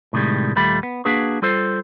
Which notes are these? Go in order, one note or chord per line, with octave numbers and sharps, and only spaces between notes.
A2 C3 D#3 G3 G#3
D#2 A#2 G3 A3 B5
B3
A#3 D4 F#4 G#4 B4
G3 F4 A4 C5